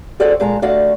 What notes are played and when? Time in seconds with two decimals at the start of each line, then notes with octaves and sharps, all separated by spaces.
0.20 F#4 G#4 A4 C5 D5 D#5
0.40 A#2 G#3 A5 A#5
0.62 D3 A3 F#4 D5 F5 A5